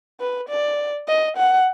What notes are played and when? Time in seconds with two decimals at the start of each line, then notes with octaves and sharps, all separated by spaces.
0.20 B4
0.49 D5
1.08 D#5
1.37 F#5